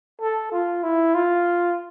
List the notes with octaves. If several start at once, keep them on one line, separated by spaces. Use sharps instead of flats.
A4
F4
E4
F4